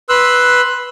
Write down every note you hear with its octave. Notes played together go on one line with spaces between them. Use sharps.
B4 C6 E6 F#6